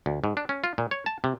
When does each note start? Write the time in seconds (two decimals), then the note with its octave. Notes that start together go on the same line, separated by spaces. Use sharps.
0.06 D2
0.24 G#2
0.37 D4
0.49 C#4
0.64 F4
0.78 A#2
0.91 C#5
1.06 A5
1.24 C3